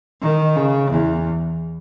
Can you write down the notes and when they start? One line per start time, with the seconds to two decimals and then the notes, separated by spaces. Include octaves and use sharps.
0.22 D#3
0.56 C#3
0.91 E2